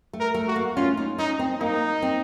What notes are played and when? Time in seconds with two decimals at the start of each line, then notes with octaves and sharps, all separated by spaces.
0.13 A3
0.20 A#4
0.34 A3
0.48 F#4
0.56 A#3
0.76 C#4 F4
0.97 D#4
1.18 C#4 D#4
1.39 C4
1.60 A#3 D#4
2.02 C4